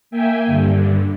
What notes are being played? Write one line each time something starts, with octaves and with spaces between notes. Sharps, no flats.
A#3 E5 G5 G#5
G2 D3